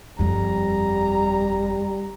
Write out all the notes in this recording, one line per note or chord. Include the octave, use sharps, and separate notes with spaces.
G1 F2 G3 A#5